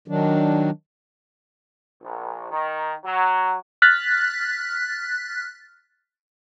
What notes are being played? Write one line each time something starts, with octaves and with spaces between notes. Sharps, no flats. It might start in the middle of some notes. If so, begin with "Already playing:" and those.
D#3 F#3 D4
A#1
D#3
F#3
F6 F#6 A6 B6